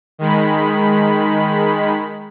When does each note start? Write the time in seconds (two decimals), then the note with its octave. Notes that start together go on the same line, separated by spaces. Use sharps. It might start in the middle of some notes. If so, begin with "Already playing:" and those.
0.19 D#3 G#3 B5